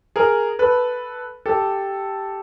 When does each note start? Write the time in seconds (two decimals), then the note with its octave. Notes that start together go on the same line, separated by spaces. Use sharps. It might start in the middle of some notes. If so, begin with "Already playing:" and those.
0.16 G#4 A#4
0.59 A4 B4
1.46 G4 A4